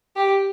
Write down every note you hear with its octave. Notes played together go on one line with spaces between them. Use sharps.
G4